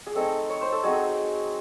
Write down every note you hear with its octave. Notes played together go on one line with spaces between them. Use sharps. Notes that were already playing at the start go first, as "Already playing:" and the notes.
G#4
A3 C4 D#4 A4
C#5
C5
A4
F#3 C4 D#4 G#4